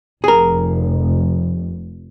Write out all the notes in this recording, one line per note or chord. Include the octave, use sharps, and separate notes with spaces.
F1 G#4 A#4